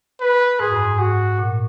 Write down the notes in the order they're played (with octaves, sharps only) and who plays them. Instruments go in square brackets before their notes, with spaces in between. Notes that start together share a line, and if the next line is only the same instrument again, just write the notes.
[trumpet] B4
[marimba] G#2 [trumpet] G#4
[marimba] F#2
G#2
[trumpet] F#4
[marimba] A#2